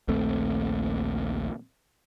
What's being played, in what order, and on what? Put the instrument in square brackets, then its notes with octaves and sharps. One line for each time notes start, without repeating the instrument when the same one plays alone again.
[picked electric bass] A#1 D#2 A3 C4